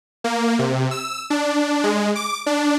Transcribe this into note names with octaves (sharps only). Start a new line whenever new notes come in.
A#3
C3
E6
D4
G#3
D6
D4